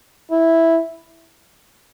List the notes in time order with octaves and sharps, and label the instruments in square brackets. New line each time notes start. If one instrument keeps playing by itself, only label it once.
[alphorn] E4